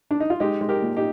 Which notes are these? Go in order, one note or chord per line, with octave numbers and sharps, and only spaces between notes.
D4
D#4
F4
G#3 D#4 G4
G#3
G4 A#4
A#2
D#4 G4